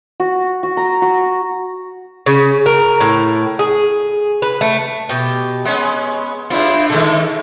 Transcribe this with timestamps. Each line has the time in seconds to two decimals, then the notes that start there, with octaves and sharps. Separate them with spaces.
0.20 F#4
0.63 F#4
0.77 A#5
1.02 F#4
2.26 C#3
2.66 A#4
3.00 A2
3.59 G#4
4.42 B4
4.61 A3
5.09 B2 G4
5.65 G#3 B3 C#4
6.50 G2 C#3 E4 F4
6.90 D3 D#3 G#3 A3 A4